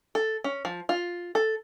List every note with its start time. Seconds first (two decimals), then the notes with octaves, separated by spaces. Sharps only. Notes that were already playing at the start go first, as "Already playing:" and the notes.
0.15 A4
0.44 C#4
0.65 F3
0.89 F4
1.35 A4